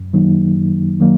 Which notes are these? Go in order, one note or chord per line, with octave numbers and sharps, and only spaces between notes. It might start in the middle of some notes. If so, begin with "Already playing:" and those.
Already playing: F#2
D#3 F#3 A#3 D#4
F#2
D#3 F#3 A#3